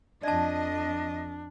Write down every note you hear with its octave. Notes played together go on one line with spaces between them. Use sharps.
F2 D4 D5 D#5 A5